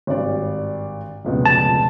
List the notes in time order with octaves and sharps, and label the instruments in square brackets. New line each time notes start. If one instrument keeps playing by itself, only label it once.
[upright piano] G#1 G2 D5
F1 C#2 B2
[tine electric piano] A5